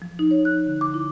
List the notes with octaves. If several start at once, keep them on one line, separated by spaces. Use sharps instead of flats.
F3
D#4
C#5
F#6
D3
D6
E4